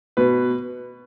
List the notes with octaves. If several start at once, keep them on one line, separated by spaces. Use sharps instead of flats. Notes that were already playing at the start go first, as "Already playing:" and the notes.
B2 B4